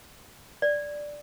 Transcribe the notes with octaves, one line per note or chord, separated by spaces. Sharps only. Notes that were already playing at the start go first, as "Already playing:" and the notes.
D5